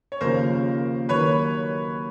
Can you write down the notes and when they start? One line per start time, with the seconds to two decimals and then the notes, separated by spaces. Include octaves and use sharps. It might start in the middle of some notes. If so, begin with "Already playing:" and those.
0.12 C#5
0.21 D#2 C#3 F3 A#4 C5
1.09 D#2 D#3 F#3 A#3 B4 C#5